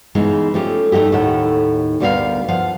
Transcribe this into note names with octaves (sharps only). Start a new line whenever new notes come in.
C#3 E3 G#3 B3 D#4
F3 A3 C#4 G4
G3 A3 D#4 F#4 G4
D#2 A2 D#3 G4 A4 F#5
D2 G3 B3 A4 A#4 F5
F3 F5 F#5